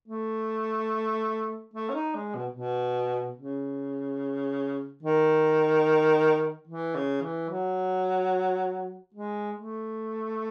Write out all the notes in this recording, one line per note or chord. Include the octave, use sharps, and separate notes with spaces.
A3
A3
C#4
D#4
G#3
B2
B2
C#3
D#3
E3
C#3
E3
F#3
G#3
A3